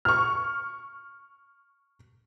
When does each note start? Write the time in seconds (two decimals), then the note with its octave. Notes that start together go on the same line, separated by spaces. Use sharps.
0.05 C#6 F6